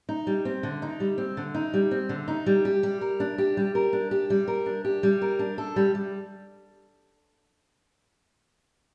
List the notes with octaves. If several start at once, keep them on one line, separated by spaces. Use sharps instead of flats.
D#4
G3
C4
D3
D#4
G3
C4
D3
D#4
G3
C4
D3
D#4
G3
G4
G3
A#4
D4
G4
G3
A#4
D4
G4
G3
A#4
D4
G4
G3
A#4
D4
A4
G3
G3